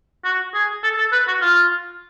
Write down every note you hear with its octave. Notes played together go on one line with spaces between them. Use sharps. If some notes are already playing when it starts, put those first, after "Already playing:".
F#4
G#4
A4
A4
B4
F#4
F4